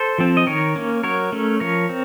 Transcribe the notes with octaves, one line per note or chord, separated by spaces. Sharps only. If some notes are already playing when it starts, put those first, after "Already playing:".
Already playing: A4 C5
F3 C4
D#5
D#3 A#4 C#5
A#3 C#4
F#3 A#4 C#5
A3 C#4
F3 A#4 C#5
C4